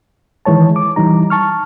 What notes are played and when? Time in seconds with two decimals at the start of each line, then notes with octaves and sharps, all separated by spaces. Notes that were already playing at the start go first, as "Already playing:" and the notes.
0.45 D#3 E3 G#3 C#5 A5
0.76 D6
0.96 E3 G3 D#4 A#5
1.30 A5 C#6 F6